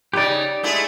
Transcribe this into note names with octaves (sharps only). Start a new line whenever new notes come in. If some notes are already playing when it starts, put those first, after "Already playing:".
C#3 D#4 G4 D5
G#3 A3 E4